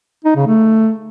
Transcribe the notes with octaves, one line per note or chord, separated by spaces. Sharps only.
D#4
C#3
A3